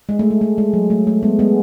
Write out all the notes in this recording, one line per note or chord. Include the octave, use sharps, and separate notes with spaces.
G#3
A3
G#3
A3
G#3
F#3
A3
A3
G#3 B3
G#3 B3